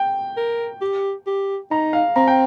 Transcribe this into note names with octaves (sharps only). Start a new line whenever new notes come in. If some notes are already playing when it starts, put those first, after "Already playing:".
Already playing: G5
A#4
G4
G4
D#4 A#5
F5
C4 A#5
G5